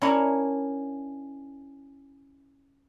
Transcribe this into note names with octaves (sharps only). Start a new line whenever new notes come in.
C#4 D4 E4 A#4 C#5